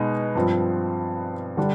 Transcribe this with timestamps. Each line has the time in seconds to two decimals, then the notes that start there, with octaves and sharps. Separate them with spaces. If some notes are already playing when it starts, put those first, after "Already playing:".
Already playing: B2 G#3 B3 D#4
0.35 G2 F3 C4
1.57 D3 G3 D4